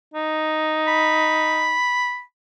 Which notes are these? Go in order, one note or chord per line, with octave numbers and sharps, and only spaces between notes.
D#4
B5